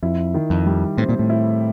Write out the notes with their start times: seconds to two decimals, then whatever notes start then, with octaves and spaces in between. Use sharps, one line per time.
0.02 F2 E4
0.34 D#3
0.50 F2
0.66 G3
0.98 A2 C4
1.09 A#2
1.19 A2
1.30 E4